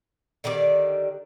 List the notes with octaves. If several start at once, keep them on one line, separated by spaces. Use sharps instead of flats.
D3 D#3 G3 D5